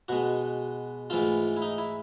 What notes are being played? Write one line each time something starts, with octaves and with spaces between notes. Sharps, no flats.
B2 G#3 F#4
G#2 E3 A3 F4
E4
D#4
E4